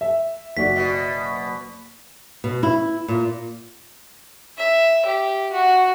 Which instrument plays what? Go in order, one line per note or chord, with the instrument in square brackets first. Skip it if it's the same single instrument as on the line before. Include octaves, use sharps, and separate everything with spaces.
[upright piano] E5
[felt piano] F#1 F#4 D5 [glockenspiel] B6
[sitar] B2
[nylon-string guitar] B2
E4
A#2
[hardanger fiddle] E5
G4
F#4